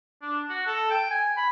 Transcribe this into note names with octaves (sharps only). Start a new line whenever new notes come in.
D4
F#4
A4
G5
G#5
B5